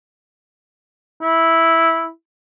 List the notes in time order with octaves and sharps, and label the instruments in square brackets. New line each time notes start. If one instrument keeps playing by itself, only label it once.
[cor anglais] E4